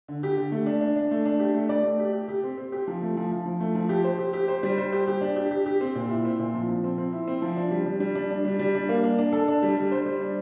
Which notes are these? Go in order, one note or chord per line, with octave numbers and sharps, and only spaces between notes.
D3
G4
D3
A3
D4
D4
D4
A3
D4
G4
A3
D5
A3
G4
G4
G4
C4
C4
G4
F3
A3
F3
F3
F3
A3
F3
G4
C5
G4
G4
C5
G3
C5
G4
G4
D4
G4
G4
G4
C4
A#2
E4
C4
A#2
F3
F3
C4
C4
E4
C4
F3
D4
G3
G3
G3
D4
D4
G3
G3
D4
A#3
D4
D4
A4
D4
G3
G3
C5
G3
D4